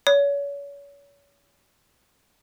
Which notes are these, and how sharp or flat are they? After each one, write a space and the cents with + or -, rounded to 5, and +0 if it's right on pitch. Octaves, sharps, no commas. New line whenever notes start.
C#5 +35